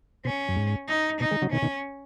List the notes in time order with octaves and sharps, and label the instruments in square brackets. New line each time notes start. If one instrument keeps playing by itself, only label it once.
[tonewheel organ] B2 [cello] C#4
[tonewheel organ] F#2
G#2
[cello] D#4
[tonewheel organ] B2 [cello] D#4
[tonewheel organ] D#3 G#3
C#3 F#3
[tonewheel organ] B2 D#3 [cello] C#4
[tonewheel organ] B2 D#3